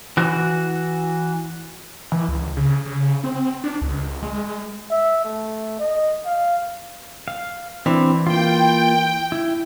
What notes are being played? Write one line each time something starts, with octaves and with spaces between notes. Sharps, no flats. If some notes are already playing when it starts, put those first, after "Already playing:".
E3 F#4
E3
C#2
C#3
C#3
C4
D4
C#2
G#3
E5
A3
D#5
F5
F5
E3 C4 D4
A#3 F4 G5
E4